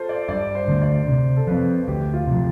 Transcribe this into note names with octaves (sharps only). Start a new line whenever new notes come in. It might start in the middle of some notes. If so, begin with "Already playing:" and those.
Already playing: F4 A4 C5
D5
G2 D5
C5
D3 A3 D4
D5
C3
A4
F3 C4 B4
D2 G4
F4
C3 F3